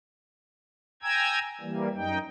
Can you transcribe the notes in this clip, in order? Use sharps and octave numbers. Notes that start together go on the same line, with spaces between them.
G5 G#5 A#5 E6 G#6
E3 G3 A#3
F#2 D#4 G5